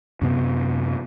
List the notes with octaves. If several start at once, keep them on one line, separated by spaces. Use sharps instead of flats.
F#2 C3 B3